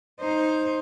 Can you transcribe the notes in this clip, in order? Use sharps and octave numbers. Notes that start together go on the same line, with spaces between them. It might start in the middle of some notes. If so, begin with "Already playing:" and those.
D#4 C5